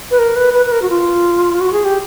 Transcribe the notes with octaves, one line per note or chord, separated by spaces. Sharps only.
B4
A#4
B4
B4
B4
A#4
F#4
F4
F#4
G#4
G4